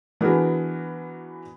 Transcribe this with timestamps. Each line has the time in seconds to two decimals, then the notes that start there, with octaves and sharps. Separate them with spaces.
0.21 E3 B3 D4 F#4 G#4 A#4